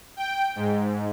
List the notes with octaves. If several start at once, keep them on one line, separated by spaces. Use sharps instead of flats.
G5
G#2